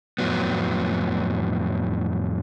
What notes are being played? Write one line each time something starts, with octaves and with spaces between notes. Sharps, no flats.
F2 A2 F#3 B3